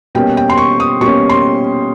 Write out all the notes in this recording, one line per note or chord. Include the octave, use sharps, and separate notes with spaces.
B2 G3 A#3 C#4 G5
G5
C6
C#6
D#6
B2 G3 A#3 C#4 C#6
C6